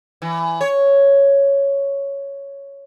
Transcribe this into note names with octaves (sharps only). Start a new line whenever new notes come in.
E3
C#5